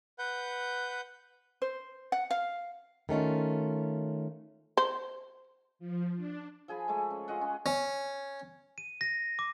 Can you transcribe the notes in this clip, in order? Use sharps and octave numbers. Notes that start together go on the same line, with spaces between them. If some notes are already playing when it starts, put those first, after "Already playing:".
B4 F#5 G6
C5
F#5
F5
D#3 A3 C#4 F4
C5
F3
D4
F3 G#4 G#5 B5
G#3 A3 B5
C#4
F4 G#4 D#5 F#5
C#4
C#4
D#7
A#6
D6